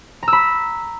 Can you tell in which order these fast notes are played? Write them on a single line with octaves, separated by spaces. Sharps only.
A#5 E6 B5